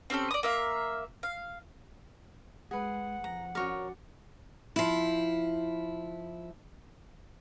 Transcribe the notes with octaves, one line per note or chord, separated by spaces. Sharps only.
C4 C#4 G4 A4
D5 D#6
A#3 E5 F5
F5
G#3 G#4 B4 F#5
F2 A#5
C#4 F#4 A#4 C#5 D5
F3 E4